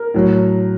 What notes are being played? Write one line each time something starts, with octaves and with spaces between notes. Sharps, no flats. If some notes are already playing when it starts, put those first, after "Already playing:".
Already playing: A#4
A2 F#3